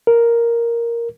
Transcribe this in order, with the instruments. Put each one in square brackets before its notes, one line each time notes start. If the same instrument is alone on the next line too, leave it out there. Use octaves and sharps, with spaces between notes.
[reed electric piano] A#4